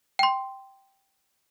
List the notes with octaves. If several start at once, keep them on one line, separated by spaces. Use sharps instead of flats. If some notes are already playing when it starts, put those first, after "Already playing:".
G5 C6